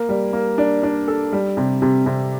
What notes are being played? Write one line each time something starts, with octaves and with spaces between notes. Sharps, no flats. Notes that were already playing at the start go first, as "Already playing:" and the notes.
Already playing: A#3
G3
A#3
D4
D4
A4
G3
C3
C3
C3